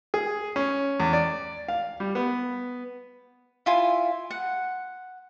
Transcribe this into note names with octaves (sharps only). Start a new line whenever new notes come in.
G#4
C#4
E2
D5
F5
G3
B3
E4 F4 G#5
F#5